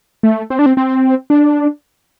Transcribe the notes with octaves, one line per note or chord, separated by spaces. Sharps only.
A3
C4
D4
C4
C4
D4